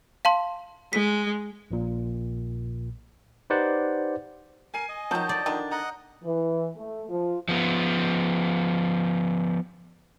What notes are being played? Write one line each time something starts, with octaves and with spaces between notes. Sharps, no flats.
F5 A5 C6
G#3 B6
A#1 A#2
D#4 G4 B4 C5 D5 F#5
A#4 G#5 C7 D#7
D#5
D#3 F3 F#3 A5 G6
D5
D3 D#3 D4
D#5 F#5 A#5
E3
A3
F3
F3 B3